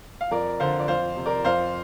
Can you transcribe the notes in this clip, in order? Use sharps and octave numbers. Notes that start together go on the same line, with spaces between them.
F5
F2 A#4 D5
D3 C5 F5
D5
F2 C5 F5
C3
A#4 D5
F2 C5 F5